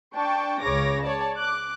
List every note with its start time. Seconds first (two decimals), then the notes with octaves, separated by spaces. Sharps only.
0.15 D4 G5 A5 C#6
0.63 C#2 C#3 C#5 D6 A#6
1.03 C#5 D5 A5
1.37 D6 F#6